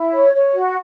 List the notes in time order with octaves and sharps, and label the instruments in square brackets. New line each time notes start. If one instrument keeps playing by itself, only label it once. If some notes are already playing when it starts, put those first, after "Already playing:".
Already playing: [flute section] E4
C#5
C#5
F#4